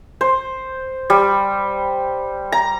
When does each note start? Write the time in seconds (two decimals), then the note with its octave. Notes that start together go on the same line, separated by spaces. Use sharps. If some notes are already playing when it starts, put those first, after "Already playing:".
0.21 C5
1.10 G3
2.52 A#5